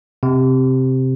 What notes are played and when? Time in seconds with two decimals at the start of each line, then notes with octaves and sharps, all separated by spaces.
0.23 C3